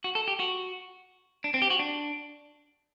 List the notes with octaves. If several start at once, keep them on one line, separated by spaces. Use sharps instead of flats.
F#4
A4
G4
F#4
D4
C4
G4
F#4
D4